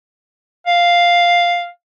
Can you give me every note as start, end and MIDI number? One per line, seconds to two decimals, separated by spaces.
0.67 1.69 77